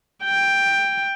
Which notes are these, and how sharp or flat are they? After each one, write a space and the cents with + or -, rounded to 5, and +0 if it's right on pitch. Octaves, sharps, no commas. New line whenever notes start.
G5 +10